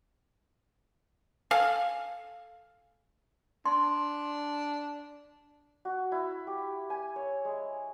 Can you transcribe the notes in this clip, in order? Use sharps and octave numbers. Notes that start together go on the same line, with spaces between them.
A4 F5 G#5
D4 C6
F#4
E4
G4
G#5
C#5
G#3